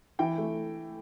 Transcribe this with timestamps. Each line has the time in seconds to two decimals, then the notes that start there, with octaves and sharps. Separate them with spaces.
0.19 E3 G5
0.38 A3